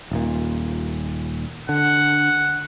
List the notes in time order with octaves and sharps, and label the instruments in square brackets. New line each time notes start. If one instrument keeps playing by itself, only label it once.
[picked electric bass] D#1 A#2
[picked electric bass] D3 [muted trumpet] F#5